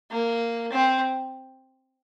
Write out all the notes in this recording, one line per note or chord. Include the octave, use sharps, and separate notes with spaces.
A#3
C4